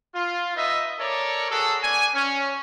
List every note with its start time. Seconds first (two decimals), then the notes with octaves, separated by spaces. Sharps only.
0.15 F4
0.56 D#4 B4 D#5 E5
0.99 A4 A#4 C#5 D5
1.51 F#4 G#4 A4
1.83 B3 D5 G#5
2.14 C#4